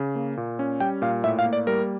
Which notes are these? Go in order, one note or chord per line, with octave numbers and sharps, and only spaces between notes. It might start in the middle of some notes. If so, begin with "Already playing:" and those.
Already playing: C#3
A#3
A#2
C#4
G3 G5
A#2 F5
A2 E5
F5
A#3
D5
G3 A#4